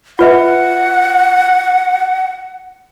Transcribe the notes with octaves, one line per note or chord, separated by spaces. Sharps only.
F4 B4 E5 F#5